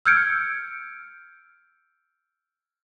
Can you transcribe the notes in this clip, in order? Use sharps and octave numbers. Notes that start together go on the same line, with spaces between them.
E6 F6 G6 G#6 C#7 D7